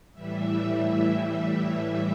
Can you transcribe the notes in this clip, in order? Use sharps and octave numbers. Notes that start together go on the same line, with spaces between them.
A2 E3 G3 E5